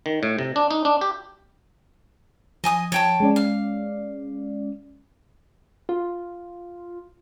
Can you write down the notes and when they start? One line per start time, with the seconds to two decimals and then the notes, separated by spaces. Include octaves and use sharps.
0.06 D#3
0.23 A2
0.39 C3
0.56 D4
0.71 D#4
0.85 D4
1.01 G4
2.64 F3 D#5 G#5 D#6
2.92 F3 C#5 G5 A5
3.20 G#3 C#4 D5
3.36 F5
5.89 F4